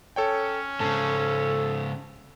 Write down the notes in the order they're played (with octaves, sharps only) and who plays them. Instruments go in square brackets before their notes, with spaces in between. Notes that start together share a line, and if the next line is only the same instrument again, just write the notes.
[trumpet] C#4 [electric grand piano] A4 C#5 G5
[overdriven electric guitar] G#2 C#3 [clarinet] A4 [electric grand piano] A5